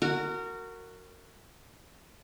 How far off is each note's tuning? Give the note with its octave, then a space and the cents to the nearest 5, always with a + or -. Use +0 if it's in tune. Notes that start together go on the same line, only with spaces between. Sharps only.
F#4 +0 A#4 -25